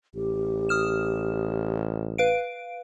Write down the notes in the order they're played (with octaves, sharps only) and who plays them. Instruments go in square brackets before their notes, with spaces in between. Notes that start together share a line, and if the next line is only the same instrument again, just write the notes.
[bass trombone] A1 [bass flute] G4
[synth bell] D#6 F6 E7
B4 F5 D7